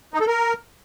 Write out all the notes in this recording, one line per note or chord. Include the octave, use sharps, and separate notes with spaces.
D#4
A4
A#4